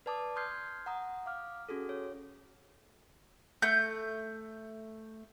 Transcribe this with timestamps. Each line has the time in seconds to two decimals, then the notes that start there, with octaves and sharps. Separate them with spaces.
0.06 B4 D5 A5 D6 D#6
0.36 C6 D#6 F6 G6 G#6 C7
0.86 F#5 A#5 D#6
1.26 F5 D6 F6
1.69 C#4 F#4 G#4 A4
1.89 C#5
3.62 A3 G6